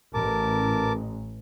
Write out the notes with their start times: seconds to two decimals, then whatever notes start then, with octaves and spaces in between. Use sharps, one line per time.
0.14 A1 A#4 A5 D6